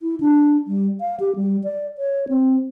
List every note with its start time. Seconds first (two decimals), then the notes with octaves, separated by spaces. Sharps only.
0.01 E4
0.20 D4
0.67 G3
1.00 F5
1.20 G4
1.36 G3
1.64 D5
1.98 C#5
2.29 C4